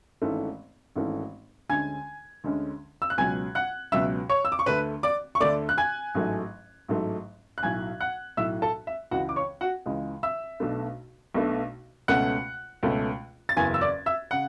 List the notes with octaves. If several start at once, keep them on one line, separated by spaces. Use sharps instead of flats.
G#1 G#2 E3 A3 C#4
G#1 G#2 E3 A3 C#4
D2 D3 G#3 C#4 G#5 G#6
D2 D3 G#3 C#4
E6
F#6
C#2 B2 F#3 C#4 G#5 G#6
F#5 F#6
C#2 B2 F#3 C#4 E5 E6
C#5 C#6
E6
D6
C#6
D2 D3 A3 B4 B5
D5 D6
C#6
D2 D3 A3 D5 D6
F#6
G#5 G#6
A1 G#2 F#3 A3
A1 G#2 F#3 A3
F#6
B1 A2 F#3 G#5 G#6
F#5 F#6
B1 A2 F#3 E5 E6
A4 A5
E5
C#2 C#3 E3 G#3 F#4 F#5
D6
C#5 C#6
F#4 F#5
C#2 C#3 E3 G#3
E5 E6
B1 B2 A3 D4
B1 B2 A3 D4
C#2 B2 A3 C#4 F#5 F#6
C#2 B2 A3 C#4
A6
F#1 E2 C#3 E3 G#5 G#6
E6
D5 D6
E5 E6
C#3 F#5 F#6